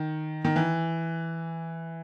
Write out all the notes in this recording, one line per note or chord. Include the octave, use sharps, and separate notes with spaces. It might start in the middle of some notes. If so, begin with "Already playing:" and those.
Already playing: D#3
D#3
E3